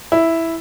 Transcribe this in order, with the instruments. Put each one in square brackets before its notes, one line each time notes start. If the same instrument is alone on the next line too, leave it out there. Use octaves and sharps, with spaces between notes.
[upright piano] E4